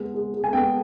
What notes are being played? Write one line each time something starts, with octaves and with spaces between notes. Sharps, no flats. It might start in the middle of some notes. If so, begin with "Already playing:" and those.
Already playing: G#3 B3
G#3
G#3
G#5
B3 G5